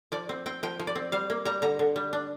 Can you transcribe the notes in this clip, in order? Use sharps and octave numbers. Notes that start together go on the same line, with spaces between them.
F3 D5
C4
C4 G5
F3 G5
F3
D5
C4
G3 F5
A#3
G3 A#5
D3 A#5
D3
G3
D4